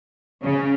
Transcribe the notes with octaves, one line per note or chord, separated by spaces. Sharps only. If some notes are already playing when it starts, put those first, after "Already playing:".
C#3